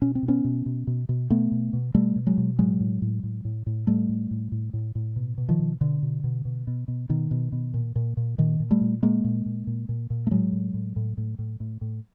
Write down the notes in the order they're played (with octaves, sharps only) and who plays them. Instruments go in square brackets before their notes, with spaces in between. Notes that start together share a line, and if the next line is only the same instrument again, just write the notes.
[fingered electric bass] B2 C#4
C4
B2
B3 C#4
B2
B2
B2
B2
B2 A3 B3
B2
B2
B2 G3 A3
B2
F#3 G#3
B2
A2 F#3 G#3
A2
A2
A2
A2
A2
A2 G3 A3
A2
A2
A2
A2
A2
B2
B2
D#3 F3
B2
B2 D3
B2
B2
B2
B2
B2
B2 D#3
B2
B2
A#2
A#2
A#2
A#2 D#3
A#2
G3 A3
A#2
A#2 G#3 A#3
A#2
A#2
A#2
A#2
A#2
A3
A2 F#3 G#3
A2
A2
A2
A2
A2
A2
A2